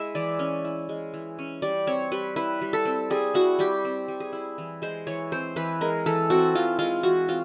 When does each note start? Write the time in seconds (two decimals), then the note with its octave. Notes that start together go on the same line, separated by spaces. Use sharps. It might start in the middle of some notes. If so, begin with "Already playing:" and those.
Already playing: G#3 E4 E5
0.15 E3 D5
0.39 C#4
0.65 E4
0.89 G#3
1.14 E3
1.39 C#4
1.62 G3 D5
1.87 C4 C#5
2.12 G3 B4
2.36 E4 B4
2.62 G3
2.73 A4
2.85 C4
3.10 G3 G#4
3.34 E4 F#4
3.59 G3 G4
3.85 C4
4.08 G3
4.20 G#4
4.33 E4
4.58 E3
4.82 G#3 C5
5.07 E3 C#5
5.32 C4 C5
5.56 E3 B4
5.81 G#3 A#4
6.06 E3 A4
6.30 C4 F#4
6.55 E3 F4
6.79 G#3 F4
7.03 E3 F#4
7.28 C4 F4